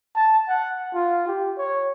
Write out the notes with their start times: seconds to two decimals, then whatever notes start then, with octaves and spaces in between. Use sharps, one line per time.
0.16 A5
0.49 F#5
0.94 F4
1.27 G4
1.57 C#5